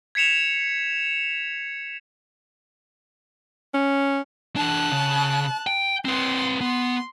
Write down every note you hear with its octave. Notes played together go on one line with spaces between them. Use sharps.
G#6 B6 C#7 E7 F7
C#4
E3 D4 A5 F#6
C#3
G5
C4 B4 C6
B3 C6